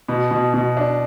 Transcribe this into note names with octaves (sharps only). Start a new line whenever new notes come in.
B2
B2
B2
D4